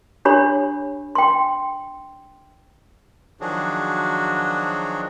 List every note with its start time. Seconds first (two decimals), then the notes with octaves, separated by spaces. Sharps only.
0.25 D4 G4 C#5 B5
1.15 G5 C6
3.41 D#3 F3 F#3 D4 F#4 G#4